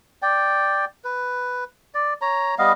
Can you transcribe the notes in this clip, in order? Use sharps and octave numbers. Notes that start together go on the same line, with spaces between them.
D5 G5
B4
D5
C#5 A#5
G3 B3 D#5 F5